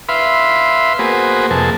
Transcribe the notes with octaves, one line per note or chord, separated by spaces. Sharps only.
B4 E5 F5 B5 C6
A#3 B3 F#4 G#4 B4 C5
F2 C3 A#3 G#4 A5